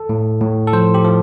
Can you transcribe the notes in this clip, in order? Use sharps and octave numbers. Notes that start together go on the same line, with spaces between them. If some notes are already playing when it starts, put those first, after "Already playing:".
Already playing: A4
A2
A2
A4
F3 C5
G4
F3